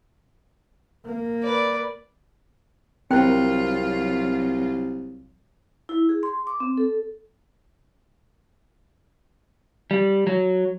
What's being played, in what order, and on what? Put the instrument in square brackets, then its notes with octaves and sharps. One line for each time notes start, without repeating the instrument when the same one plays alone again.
[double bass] A#3
[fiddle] B4 D5
[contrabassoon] C2 [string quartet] F#3 F4 [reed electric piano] C4 A#4 [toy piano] C5 G5
[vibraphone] E4
G#4
C6
D6
C4
A4
[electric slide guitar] G3
F#3